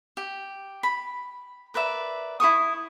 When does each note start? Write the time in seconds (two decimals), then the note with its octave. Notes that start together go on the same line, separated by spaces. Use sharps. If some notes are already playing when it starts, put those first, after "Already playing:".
0.17 G4
0.83 B5
1.74 A#4 B4 D5 E5
2.40 E4 A4 C#6 D#6